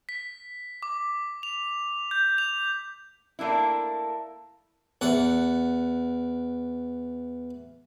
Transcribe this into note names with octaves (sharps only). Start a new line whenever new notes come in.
B6
D6
F7
G6
F7
A3 A#3 D4 E4
E2 F#5